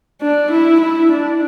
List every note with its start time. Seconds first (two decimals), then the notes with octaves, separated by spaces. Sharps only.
0.21 D4
0.51 E4
0.81 E4
1.12 D4